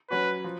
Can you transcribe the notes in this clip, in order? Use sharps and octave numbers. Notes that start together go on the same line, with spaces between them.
F#3 C#4 F#4 B4
F3